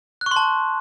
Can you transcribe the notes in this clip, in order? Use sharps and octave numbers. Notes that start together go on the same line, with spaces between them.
F#6
C#6
C6
A5